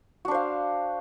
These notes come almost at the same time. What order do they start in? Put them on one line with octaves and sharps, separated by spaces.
F#4 D4 C5 F5